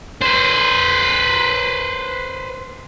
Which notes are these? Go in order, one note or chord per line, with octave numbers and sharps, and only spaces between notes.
B4 C5